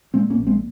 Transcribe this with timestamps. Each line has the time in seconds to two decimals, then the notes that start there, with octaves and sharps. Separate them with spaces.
0.14 A#2 G#3 C4
0.30 A#3 C#4
0.38 A#1
0.47 G#3 C4